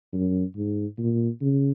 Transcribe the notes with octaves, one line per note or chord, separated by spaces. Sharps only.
F#2
G#2
A#2
C#3